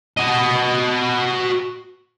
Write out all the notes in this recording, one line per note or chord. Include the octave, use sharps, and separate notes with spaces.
F#4 D#5